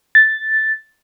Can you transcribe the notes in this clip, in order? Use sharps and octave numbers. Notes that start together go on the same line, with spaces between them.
A6